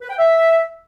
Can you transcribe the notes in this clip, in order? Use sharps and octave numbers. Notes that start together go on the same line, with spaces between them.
B4
G5
E5